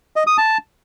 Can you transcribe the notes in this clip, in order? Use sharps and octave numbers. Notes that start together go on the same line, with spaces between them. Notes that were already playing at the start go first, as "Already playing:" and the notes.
D#5
D#6
A5